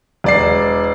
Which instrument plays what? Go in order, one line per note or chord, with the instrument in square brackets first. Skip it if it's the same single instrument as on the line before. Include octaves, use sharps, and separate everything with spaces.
[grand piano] E1 D5 C7